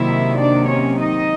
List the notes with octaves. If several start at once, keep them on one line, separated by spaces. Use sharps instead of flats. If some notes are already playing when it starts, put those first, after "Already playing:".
Already playing: C3 D#3 F#3 A#3 E4 E5
D4 D5
C#4 C#5
D#4 D#5